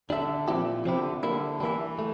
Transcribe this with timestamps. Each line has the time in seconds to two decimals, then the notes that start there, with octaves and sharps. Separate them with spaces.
0.10 D3 G3 D4 A4 E5
0.47 A#2 F3 C4 E4 G4
0.85 C3 F3 C4 E4 G4
0.98 D3
1.23 D3 G3 A#3 E4
1.60 E3 G3 A#3 E4
1.99 A3